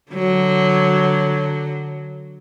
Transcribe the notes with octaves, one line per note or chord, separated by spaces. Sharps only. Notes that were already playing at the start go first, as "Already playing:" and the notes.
D3 F#3